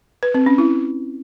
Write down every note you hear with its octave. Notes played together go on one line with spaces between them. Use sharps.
B4
C4
C#4
E4